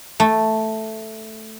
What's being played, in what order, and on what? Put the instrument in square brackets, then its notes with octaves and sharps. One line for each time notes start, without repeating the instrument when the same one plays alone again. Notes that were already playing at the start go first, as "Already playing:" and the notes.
[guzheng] A3